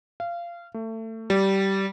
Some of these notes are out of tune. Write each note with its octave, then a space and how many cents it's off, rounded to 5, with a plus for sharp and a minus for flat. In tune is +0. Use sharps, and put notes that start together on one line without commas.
F5 -20
A3 +25
G3 -15